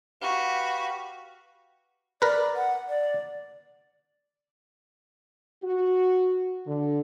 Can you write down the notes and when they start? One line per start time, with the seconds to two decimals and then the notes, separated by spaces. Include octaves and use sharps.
0.22 F#4 G4 B4 F5
2.22 A#4 B4 D5
2.56 F#5
2.89 D5
5.64 F#4
6.66 D3